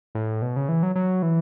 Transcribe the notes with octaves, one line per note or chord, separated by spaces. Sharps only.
A2
B2
C#3
E3
F#3
F#3
E3